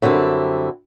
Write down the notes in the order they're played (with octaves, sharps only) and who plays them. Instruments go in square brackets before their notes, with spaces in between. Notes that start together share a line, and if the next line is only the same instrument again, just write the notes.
[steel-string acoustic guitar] F#2 D3 G3 C4 E4